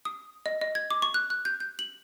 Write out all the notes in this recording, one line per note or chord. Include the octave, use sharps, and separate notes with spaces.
D#6
D#5
D#5
G#6
D6
C#6
F#6
F#6
G6
G6
F#7